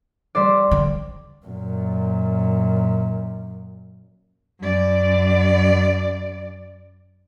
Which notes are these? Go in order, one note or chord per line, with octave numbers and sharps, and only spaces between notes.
G3 C5 D5
D3
F#2 A#2
F#2 D5